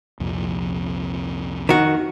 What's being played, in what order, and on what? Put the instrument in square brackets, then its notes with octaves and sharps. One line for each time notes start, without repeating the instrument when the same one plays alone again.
[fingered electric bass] C2 F2 A#2
[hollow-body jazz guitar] D#3 F#4